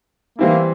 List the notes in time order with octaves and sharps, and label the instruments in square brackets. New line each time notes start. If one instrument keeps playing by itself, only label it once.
[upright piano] E3 G3 C4 E4 [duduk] A#3